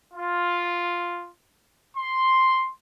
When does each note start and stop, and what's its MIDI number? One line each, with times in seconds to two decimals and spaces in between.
0.14 1.29 65
1.96 2.70 84